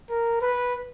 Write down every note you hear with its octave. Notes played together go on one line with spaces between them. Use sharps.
A#4
B4